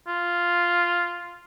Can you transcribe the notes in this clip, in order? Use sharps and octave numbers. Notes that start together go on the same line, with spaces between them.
F4